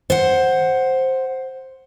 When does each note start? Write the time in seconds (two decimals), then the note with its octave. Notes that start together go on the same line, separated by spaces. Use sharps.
0.10 C5 F#5